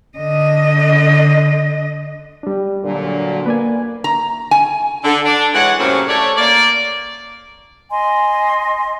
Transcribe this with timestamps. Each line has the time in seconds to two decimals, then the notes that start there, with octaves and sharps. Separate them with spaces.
0.18 D3 D#5
2.43 G3 D4
2.84 A#2 D3 F#3
3.46 A#3 B4 D5 G#5
4.04 A#5
4.51 G#5
5.04 D3
5.25 D4
5.54 E3 G#3 C#5 F#5
5.79 F#2 A2 C3 A#3 C4 C#4
6.09 A3 C#5 D5
6.37 A#3 D5
7.91 D#5 G#5 C6